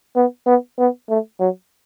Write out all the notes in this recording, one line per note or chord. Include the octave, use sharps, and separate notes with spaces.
B3
B3
B3
A3
F#3